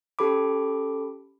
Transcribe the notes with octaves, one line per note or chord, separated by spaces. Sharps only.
C#4 G4 A4 B5 D6